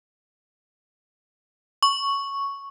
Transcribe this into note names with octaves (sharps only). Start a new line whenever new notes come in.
C#6